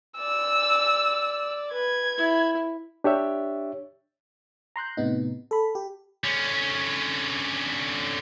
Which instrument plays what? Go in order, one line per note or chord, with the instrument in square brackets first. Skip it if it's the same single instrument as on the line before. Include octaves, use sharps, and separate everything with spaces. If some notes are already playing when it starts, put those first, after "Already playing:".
[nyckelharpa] D5 [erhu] E6
[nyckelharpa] B4 [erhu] G#6
[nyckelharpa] E4
[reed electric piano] D4 G4 C#5 E5
[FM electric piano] A#5 C6 F#6 G6
A2 C3 B3 D#4
A4 B5
G4
[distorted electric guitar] D3 C#4